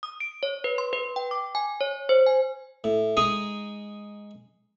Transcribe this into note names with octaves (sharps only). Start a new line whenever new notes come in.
D#6
D7
C#5
B4
C6
B4
G5
D6
G#5
C#5
C5
G#5
A2
G#3 D#4 G#4 A#5 D#6